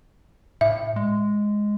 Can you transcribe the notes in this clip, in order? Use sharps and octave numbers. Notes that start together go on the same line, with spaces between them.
A2 E5
G#3